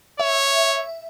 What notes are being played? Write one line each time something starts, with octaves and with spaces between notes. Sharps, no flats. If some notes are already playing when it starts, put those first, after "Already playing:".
C#5 E5